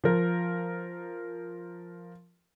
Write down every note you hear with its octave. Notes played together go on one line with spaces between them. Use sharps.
F3 A#4